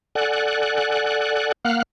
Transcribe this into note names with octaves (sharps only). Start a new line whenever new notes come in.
A4 D5 F#5 G#5 F#6
A#3 F5 F#5 F6 F#6